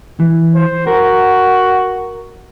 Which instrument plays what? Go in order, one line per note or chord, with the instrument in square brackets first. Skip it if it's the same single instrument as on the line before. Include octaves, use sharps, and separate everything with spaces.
[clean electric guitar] E3
[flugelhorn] C5
[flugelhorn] F#4 [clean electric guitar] A#4